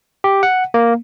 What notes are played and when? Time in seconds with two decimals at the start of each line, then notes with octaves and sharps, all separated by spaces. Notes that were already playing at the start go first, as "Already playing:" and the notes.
0.24 G4
0.43 F#5
0.74 A#3